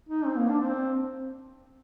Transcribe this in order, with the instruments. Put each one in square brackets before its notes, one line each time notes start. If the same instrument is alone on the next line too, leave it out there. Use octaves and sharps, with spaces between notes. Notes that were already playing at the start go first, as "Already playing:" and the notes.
[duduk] D#4
C4
A#3
D4
C4